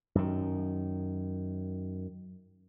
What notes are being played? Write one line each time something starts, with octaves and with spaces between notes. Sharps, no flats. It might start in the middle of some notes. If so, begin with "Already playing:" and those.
F#2 D#3